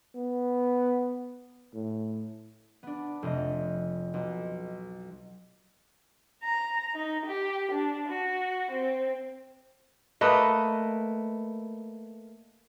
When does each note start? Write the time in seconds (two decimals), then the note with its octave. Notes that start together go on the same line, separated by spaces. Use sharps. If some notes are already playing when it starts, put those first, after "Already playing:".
0.15 B3
1.74 A2
2.83 B3 D4
3.23 F1 D#5
4.14 B1
6.43 A#5
6.95 D#4
7.26 G4
7.72 D4
8.09 F#4
8.72 C4
10.21 A3 A#3 B4 D#5